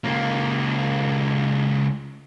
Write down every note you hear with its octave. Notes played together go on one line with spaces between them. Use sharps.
C#2 A#3